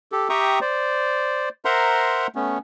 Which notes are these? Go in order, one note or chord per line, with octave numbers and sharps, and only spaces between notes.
G4 A4
G4 E5 G5 A#5 C#6 D#6
C5 D5
A#4 C5 E5 F#5 A#5 C6
A3 B3 C#4